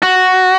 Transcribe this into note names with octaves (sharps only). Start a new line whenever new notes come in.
F#4